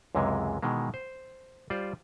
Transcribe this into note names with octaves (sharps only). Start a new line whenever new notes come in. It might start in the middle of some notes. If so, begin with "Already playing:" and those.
C#2 F#2 C3 E3 G#3
B2 D#3 E3 G#3
C5
G3 F4 C5 D5